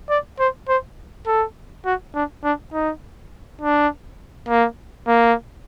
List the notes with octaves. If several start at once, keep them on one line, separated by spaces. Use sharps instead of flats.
D5
C5
C5
A4
F#4
D4
D4
D#4
D4
A#3
A#3